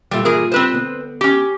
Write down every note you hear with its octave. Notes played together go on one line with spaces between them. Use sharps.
G2 A#2 G3 A3 F4
E3 G#4 A#4
C4 B4 C5
D3 B3
C#4 G4